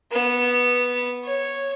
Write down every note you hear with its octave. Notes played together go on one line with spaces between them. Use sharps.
B3
C#5